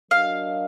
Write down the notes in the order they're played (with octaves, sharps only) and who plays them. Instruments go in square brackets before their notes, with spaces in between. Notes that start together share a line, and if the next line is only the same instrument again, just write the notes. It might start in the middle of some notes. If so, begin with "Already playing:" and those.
[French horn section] F#3 D4 F#4 A#4 D#5 [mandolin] F5